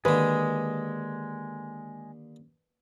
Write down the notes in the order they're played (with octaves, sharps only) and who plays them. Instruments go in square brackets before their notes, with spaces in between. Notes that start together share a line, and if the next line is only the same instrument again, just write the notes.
[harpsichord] D#2 D3 [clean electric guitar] G#3 [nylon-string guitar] B4